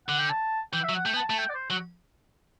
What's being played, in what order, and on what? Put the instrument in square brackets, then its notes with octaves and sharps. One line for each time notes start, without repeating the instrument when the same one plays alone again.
[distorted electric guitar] D3 [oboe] F#5
[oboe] G5
A5
[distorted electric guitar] E3 [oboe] G5
[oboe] E5
[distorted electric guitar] F#3
[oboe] F#5
[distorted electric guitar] A3 [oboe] G5
[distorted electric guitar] B3
[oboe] A5
[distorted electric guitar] A3 [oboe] A5
[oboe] G5
D5
C5
[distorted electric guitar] F#3 [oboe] F#4